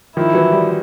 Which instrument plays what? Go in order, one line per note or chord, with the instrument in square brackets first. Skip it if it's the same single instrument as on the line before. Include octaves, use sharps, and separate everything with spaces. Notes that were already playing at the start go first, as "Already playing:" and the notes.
[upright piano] D#3 F3 [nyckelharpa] E4
[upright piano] E3 F#3
F3 G3